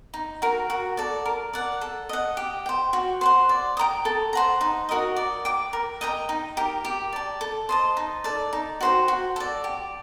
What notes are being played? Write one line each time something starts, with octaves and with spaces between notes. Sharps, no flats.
D#4
F#4 A#4
F#4
A4 D5
A#4
D5 F#5
A4
D#5 F#5
G4
C5 G5
F#4
C5 F#5 C6
D5
G5 A#5 D#6
A4
C5 F#5 A#5
D#4
F#4 A#4 D#5
D5
G5 D6
A#4
D#5 G5 A#5
D#4
G4 A#4
G4
D5 A5
A4
C5 D#5 A5
D#4
A4 D5
D#4
F#4 C5 G5
F#4
A4 D5
G4